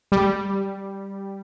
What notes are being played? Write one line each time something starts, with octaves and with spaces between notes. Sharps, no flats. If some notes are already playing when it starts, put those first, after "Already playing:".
G3